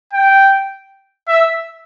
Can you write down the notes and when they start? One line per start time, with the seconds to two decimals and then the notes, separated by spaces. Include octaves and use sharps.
0.13 G5
1.28 E5